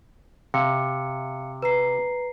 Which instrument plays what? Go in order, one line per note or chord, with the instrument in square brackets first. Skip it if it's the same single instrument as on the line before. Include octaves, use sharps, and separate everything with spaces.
[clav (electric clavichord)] C3 [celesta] F5 C#7
[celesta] B4 A#5 C7